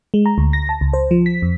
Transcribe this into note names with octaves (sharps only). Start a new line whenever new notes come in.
G#3
A#5
D2
A#6
A5
C#2
C5
F3
B6
F2